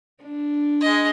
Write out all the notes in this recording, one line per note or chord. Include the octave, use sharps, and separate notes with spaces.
D4
G#3 D#5